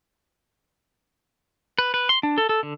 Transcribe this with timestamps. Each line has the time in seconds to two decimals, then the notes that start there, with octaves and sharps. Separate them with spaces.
1.79 B4
1.94 B4
2.09 C6
2.23 D4
2.38 A4
2.49 A4
2.63 D3